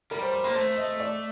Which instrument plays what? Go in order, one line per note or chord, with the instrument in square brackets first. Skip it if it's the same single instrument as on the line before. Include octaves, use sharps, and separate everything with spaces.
[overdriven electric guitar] G3 [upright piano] A#4
[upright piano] C5
C5
[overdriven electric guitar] A#3 [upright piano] C5
[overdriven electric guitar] A3 [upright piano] C5
[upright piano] D#5
D5